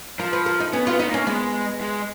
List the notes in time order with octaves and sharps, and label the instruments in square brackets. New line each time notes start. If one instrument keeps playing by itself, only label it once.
[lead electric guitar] F3 [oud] A#4
[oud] B4
A#4
D#4
[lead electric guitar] B3 [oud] C#4
[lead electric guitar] B3 [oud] F4
[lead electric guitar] B3 [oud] D#4
[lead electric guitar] A#3 [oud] C#4
[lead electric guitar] G#3 [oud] B3
[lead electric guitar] G#3